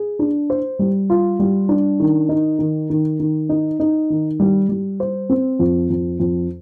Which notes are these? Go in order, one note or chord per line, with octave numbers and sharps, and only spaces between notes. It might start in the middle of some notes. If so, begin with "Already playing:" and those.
Already playing: G#4
D4
C5
G3
F4
G3
D4
D#3
D#4
D#3
D#3
D#3
D#4
D#4
D#3
G3
G3
C5
C4
F2
F2
F2